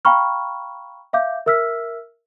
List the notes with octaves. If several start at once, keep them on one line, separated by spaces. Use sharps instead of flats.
F5 G5 A#5 B5 C#6 F6
E5 F5 D6 G6
A#4 E5 E6 F6 B6